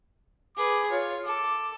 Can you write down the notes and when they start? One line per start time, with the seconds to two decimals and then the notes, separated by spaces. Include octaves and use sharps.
0.57 G#4 B4 D6
0.91 F4 C#5
1.25 A4 D6